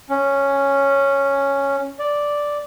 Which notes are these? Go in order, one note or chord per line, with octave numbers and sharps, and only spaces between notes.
C#4
D5